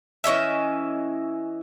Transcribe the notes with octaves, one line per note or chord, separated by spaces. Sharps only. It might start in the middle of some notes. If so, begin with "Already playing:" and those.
E3 C#4 D#5 E5